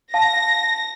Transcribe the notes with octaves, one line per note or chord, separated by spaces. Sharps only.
F5 A5 A#6